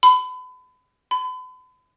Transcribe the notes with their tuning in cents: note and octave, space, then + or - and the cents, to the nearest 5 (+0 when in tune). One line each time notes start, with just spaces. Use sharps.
B5 +35
B5 +40